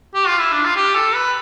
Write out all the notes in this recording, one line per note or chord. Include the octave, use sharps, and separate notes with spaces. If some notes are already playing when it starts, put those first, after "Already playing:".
G4
F4
E4
D4
F4
G4
A4
B4